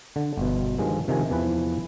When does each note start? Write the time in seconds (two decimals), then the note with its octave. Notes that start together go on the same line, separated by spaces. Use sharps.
0.16 D3
0.37 G1 B2
0.78 G2 D#3 F3 G#3
1.08 C3 D#3 F3 G#5
1.30 E2 E3 F3 B4